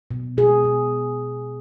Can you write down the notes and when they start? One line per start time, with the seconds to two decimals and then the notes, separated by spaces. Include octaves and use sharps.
0.11 B2
0.37 B2 G#4
0.64 B2